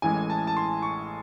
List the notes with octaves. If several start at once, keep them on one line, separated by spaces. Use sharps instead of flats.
A1 A2 E3 G#3 G#5
A5
A5
C6
C#6